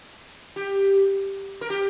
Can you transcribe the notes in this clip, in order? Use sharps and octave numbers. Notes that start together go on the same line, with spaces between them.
G4
A#4
G4